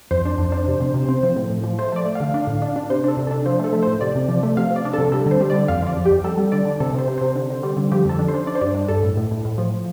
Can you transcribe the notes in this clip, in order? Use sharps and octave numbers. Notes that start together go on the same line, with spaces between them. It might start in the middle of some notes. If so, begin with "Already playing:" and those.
F2 C5
D4
F2
D4
C3
C3
C3
C4
F3
A2
A2
F3
A3 C5
A3 D5
A3
D3 F5
D4
A2
D4
D4
C3 C5
D4 A4
C3
D4 A4
F3 C5
A3
A4
A3
A2 C5
C3 D5
C3
F3
A3
C3 F5
F3
D5
D4
A4
C3
G3 A4
D3 C5
G3
D3 D5
F2 F5
F3 D5
F2
G4
F2
G3 A4
G3
D3 D5
D3
C3 A4
C3 C5
C3
C3 C5
D3
D3
G3
D3
F3 G4
F2 A4
D4
C5
D4
D4 D5
C5
G2 D5
D4
G2 A4
A2
A2
A2
A2
F3